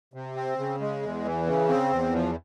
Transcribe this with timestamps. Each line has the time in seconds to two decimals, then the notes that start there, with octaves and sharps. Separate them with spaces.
0.14 C3
0.36 C4
0.58 C#3
0.80 G#3
1.02 E2
1.25 E3
1.47 C#3
1.69 C4
1.91 E2
2.13 F3